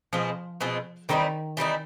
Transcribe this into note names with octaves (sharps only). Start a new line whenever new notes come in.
B2 F3 G#3 C4 F4
B2 G#3 C4 F4
D#3 E3 G3 C4 D#4
E3 G3 C4 D#4